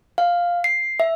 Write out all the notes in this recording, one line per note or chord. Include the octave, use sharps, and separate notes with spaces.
F5
C7
E5